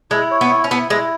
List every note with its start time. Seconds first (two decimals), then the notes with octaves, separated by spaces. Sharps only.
0.11 G#3 E4
0.31 C#5
0.41 B3
0.50 E4
0.64 C#4
0.70 B3 E4
0.90 G#3 E4